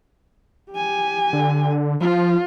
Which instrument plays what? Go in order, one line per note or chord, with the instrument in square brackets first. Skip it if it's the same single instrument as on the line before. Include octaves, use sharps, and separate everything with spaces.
[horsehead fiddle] G4 G#5
[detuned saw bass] D3
[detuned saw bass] F3 [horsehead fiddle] F4